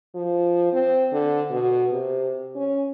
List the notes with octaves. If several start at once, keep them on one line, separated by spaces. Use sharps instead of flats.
F3
C4
D3
B2
C3
C#4